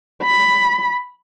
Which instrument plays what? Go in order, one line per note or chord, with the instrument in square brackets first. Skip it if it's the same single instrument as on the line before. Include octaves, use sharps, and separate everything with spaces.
[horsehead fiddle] B5